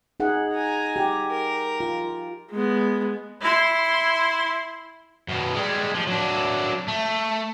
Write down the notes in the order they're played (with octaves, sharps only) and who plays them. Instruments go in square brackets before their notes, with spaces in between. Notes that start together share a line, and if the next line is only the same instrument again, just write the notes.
[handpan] D#4 G#4 F#5
[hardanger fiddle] G#5 A#5
[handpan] G4
[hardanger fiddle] A#4
[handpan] F4
[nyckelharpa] G#3 B3
[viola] E4 C6
[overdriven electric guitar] F#2 B2
G3 G#3
F3
F#3 D4
A3